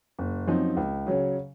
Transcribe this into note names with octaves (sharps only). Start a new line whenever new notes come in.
F#1
F#2 F3 C4 D#4
C#2
C#3 F#3 C#4